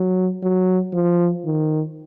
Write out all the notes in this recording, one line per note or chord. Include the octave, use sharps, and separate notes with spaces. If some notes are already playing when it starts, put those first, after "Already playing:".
Already playing: F#3
F#3
F3
D#3